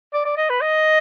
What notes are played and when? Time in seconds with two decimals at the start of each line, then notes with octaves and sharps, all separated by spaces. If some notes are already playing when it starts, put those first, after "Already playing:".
0.13 D5
0.25 D5
0.37 D#5
0.50 B4
0.61 D#5